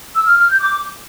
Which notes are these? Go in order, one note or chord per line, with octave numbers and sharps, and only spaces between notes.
E6
F6
F6
G6
D6